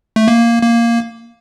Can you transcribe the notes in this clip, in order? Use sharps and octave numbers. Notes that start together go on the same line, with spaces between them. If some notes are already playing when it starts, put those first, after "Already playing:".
A3
A#3
A#3